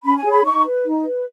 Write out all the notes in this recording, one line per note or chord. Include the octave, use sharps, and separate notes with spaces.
C#4 B5
G#5
G#4 C#5
B5
D#4 C#6
B4
D#4
B4